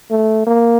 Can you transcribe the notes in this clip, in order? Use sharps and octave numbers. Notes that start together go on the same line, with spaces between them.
A3
A#3